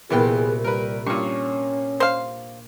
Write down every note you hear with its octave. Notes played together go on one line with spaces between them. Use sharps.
C2 A#2 E3 B3 G#4 G5
G3 A#4 B4
G2 A#2 C#4 C#6
C5 F5